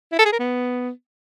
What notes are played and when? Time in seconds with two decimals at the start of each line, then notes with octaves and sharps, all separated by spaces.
0.12 E4
0.19 A4
0.25 G#4
0.32 A#4
0.39 B3